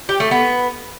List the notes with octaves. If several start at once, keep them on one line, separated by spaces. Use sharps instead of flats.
G4
A3
B3